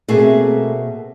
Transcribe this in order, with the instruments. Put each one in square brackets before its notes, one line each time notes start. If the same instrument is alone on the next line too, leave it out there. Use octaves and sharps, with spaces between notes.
[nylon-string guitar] B2 C4 G#4 [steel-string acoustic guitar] A3 A#3